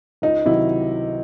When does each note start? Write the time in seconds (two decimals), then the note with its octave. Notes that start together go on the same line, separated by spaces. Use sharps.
0.22 C#2 D#4
0.45 C3 D#3 F#3 E4